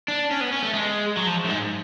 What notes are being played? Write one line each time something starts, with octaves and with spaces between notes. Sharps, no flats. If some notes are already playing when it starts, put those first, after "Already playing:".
D4
C#4
B3
C#4
A3
G#3
F#3
F3
F#2
G#2